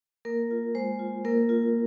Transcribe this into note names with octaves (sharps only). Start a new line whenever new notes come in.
A#3 A#4
F4
G#3 C5
F4
A#3 A#4
F4